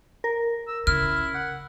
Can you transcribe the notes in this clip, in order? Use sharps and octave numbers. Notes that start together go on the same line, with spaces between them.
A#4
E6
C#3 E4 F6
F#5